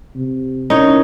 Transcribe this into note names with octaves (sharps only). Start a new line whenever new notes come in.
C3
C#4 D#4 E4 A#4 C#5